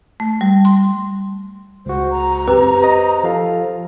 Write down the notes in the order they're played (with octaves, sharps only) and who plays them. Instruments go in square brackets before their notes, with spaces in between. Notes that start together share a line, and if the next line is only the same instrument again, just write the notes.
[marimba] A3
G3
C6
[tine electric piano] C#2 F#4 [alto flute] C5
[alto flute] A#5
[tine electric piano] F#2 C4 [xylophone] G4 B4
[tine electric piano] C5 D#5
F3 A4 F5